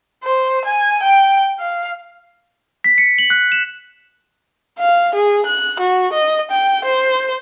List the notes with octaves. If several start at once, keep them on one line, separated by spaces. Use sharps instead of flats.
C5
G#5
G5
F5
B6
C#7
F#7
F#6
E7
F5
G#4
F#6
F#4
D#5
G5
C5